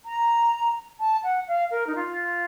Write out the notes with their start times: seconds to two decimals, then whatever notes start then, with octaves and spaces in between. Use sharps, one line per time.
0.05 A#5
0.99 A5
1.23 F#5
1.47 F5
1.70 A#4
1.86 D#4
1.95 F4